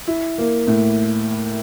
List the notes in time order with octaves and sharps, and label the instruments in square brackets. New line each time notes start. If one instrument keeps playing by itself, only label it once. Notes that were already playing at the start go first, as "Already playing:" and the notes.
[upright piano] E4
A#3
A2